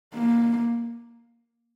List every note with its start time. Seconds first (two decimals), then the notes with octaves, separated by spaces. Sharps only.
0.14 A#3